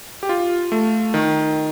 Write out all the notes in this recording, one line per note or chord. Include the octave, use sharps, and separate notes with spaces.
G4
F4
A3
D#3